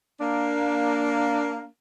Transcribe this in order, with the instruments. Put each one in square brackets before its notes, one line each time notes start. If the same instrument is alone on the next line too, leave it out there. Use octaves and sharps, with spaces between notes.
[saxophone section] A#3 D4